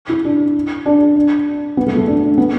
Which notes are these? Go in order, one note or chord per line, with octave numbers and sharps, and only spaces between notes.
E4
D4
D4
D4
B3
A3
A3
D4
D4
B3